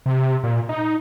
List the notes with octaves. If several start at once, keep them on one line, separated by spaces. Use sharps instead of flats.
C3
A#2
D#4